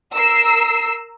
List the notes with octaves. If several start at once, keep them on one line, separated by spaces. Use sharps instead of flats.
A#4 E6 C7